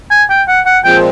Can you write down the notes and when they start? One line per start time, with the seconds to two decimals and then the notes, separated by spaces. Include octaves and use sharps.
0.11 G#5
0.30 G5
0.48 F#5
0.66 F#5
0.84 A#2 F3 G#3 C4 G5